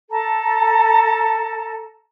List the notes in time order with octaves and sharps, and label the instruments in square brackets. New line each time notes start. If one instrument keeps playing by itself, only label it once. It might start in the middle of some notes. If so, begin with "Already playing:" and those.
[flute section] A4 A5 A#5